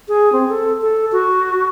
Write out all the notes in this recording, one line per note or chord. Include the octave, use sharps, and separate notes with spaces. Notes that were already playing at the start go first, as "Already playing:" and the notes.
G#4
C4
A4
A4
F#4